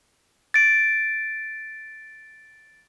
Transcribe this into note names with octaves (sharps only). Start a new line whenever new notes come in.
A6 D7